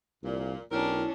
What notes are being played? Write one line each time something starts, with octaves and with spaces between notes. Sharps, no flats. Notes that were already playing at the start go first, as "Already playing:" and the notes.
C2 F2 A#2
B1 C#4 D4 E4 G4 A#4